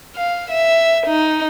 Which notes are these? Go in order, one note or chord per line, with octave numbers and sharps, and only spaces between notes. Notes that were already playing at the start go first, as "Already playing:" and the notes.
F5
E5
D#4